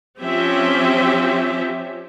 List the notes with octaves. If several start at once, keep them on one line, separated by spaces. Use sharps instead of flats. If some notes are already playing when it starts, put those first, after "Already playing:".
F3 C4 C#4 G4 E5